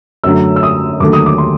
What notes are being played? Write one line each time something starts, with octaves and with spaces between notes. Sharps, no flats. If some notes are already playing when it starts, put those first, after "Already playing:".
F#2 D3 F#3 A3 E6
E6
D#6
D#2 D3 F#3 A3 D6
D#6
D6
C6